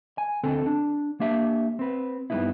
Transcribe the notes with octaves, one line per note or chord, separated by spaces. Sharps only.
G#5
D2 D3 C4 A4
D4
A#3 D4 G4 E5
C4 B4
G2 G3 A3 B3 D#4 E4